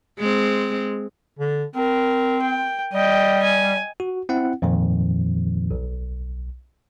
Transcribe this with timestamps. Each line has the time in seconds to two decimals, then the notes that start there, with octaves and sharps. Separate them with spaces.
0.19 G#3 C4
1.39 D3
1.76 C4 A#4
2.42 G5
2.93 G3 D#5 G5
3.43 G#5
4.00 F#4
4.29 C4 E4 F#5
4.62 F2 A#2 D#3 F3
5.71 B1